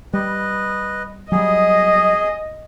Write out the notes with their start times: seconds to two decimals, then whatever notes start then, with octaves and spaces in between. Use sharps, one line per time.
0.13 G3 B4 D#5
1.32 F#3 G3 G#4 D#5